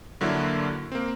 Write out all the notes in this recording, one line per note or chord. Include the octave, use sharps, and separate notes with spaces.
G2 D3 F#3 A#3 E4
A#3 C4